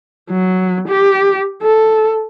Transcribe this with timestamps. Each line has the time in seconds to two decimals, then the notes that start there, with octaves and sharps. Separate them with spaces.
0.31 F#3
0.88 G4
1.62 A4